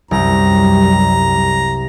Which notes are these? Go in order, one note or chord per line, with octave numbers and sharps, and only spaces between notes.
C2 F#2 G3 A#5